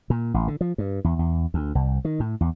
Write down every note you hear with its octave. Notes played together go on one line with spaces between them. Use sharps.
A#2
A1
D3
F3
G2
E2
E2
D2
C2
D#3
A2
E2